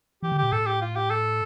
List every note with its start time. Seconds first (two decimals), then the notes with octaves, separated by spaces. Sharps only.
0.23 E3 G4
0.32 D3
0.38 A#2 G4
0.52 A2 A4
0.66 G4
0.81 F4
0.96 G4
1.10 A4